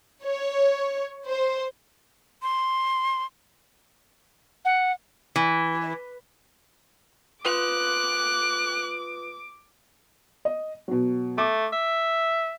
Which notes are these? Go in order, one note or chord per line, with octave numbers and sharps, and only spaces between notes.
C#5
C5
C6
F#5
E3
F4 B4 D6 D#6 F#6
D#5
B2 F#3
A3 D6
E5